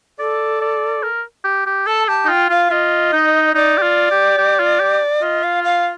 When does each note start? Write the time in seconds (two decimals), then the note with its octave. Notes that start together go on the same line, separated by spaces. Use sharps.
0.19 A4 D5
0.62 D5
1.03 A#4
1.44 G4
1.66 G4
1.87 A4 A5
2.08 G4 A5
2.25 D#4
2.28 F4 G5
2.49 F4 F5
2.71 F4 D#5
3.13 D#4
3.55 D#4 D5
3.78 G4
3.82 F4
4.11 G4
4.38 G4
4.59 F4
4.80 G4
5.22 F4 D#5
5.43 F5
5.64 F5